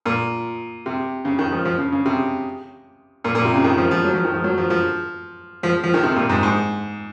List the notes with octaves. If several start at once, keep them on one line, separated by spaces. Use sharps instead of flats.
A#2
C3
C#3
D#3
F3
F3
C#3
C#3
C3
A#2
A#2
C3
C#3
D#3
F3
F3
F#3
F3
D#3
F3
F#3
F3
F3
F3
F3
D#3
C3
A#2
G#2
G#2